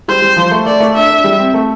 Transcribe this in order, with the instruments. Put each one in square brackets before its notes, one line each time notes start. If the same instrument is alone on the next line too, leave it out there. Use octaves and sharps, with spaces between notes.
[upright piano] G3 [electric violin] C5
[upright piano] G3
F3
A3
[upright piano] A3 [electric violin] D5
[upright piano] A3
[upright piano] D4 [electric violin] E5
[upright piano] D4
G3
C4
A3